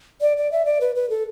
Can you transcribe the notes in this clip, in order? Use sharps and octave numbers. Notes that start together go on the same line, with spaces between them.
D5
D5
E5
D5
B4
B4
A4